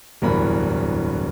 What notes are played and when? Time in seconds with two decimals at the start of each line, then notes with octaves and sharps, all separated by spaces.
0.22 D1 E2 G2 A#4 B5